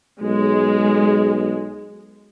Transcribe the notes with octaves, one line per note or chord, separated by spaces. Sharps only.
B1 G#3